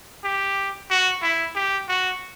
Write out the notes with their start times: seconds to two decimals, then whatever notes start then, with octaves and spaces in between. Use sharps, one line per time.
0.24 G4
0.90 F#4
1.22 E4
1.56 G4
1.89 F#4